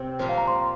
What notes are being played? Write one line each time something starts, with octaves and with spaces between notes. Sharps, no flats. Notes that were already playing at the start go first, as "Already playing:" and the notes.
Already playing: C3 C4
A#2 F3 A#3 C5
F5
A#5
C6